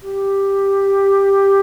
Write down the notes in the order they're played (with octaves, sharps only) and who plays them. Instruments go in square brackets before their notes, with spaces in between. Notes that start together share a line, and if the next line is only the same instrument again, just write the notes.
[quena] G4